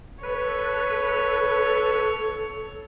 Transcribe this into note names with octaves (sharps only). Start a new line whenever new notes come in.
A4 B4 C#5